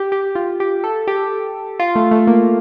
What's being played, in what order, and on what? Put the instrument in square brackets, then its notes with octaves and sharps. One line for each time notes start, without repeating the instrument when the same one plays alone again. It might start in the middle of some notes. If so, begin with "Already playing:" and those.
Already playing: [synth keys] G4
G4
F4
G4
A4
G4
F4
A3
A3
A#3